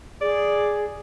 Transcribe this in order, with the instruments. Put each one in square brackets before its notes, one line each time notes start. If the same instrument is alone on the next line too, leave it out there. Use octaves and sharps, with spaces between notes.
[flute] G#4 [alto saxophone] D5